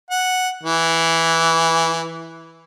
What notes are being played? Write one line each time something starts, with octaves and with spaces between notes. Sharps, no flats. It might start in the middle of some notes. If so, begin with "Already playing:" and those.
F#5
E3